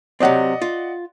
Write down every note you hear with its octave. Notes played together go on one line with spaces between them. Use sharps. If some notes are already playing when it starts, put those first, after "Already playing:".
C3 F#3 C4 D5 D#5 F#5
F4